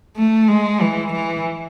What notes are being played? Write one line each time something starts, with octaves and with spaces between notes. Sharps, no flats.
A3
G#3
E3
E3